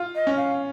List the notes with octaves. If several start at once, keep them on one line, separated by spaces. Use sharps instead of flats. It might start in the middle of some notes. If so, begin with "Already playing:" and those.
Already playing: F4
D#5
C#4
F5